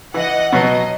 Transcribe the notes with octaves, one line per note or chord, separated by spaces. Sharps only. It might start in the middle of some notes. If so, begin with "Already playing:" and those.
E3 D#5 F#5
B2 F#3 B3 D#5